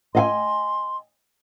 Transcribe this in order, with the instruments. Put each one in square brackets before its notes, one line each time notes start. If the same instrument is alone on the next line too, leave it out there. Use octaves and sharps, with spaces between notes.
[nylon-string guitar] D#5 F5 G#5 [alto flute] C6